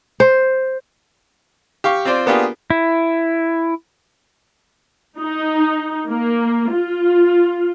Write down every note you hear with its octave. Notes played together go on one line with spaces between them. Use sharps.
C5
G4 F5 C#6
C4 F4 C5 D5
A#3 B3 D4 F4 G4 G#4
E4
D#4
A#3
F4